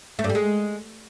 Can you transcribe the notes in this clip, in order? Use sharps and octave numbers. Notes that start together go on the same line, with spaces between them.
A3
G2
G3
G#3